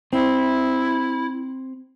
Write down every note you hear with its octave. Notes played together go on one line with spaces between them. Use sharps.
C4 E4